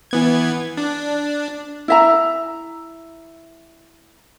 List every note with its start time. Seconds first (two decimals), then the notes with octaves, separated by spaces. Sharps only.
0.11 E3 B3 G#6
0.77 D4
1.88 E4 E5 A#5